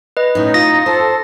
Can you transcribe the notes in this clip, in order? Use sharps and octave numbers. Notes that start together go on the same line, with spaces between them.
B4 D#5
A2 C#4 D#4
F4 D#6 A#6
A4 C5